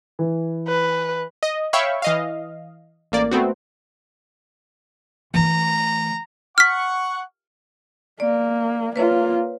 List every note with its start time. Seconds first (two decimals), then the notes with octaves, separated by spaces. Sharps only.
0.19 E3
0.68 B4
1.43 D#5
1.73 C#5 E5 F5 G5 B5 C#6
2.02 E3 D#5 F5
3.12 A1 A#3 D5
3.31 A3 B3 C4 F#4
5.34 E3 A3 A#5
6.58 F#5 C#6 F6 B6
8.20 A#3 D5
8.96 A#3 F4 B4 C#5